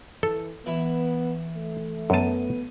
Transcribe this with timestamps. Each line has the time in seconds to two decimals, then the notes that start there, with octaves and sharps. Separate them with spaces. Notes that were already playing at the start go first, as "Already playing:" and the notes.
0.23 E3 A4
0.66 E3 B3 E4
1.55 A3
2.10 F#2 B3 A5 D#7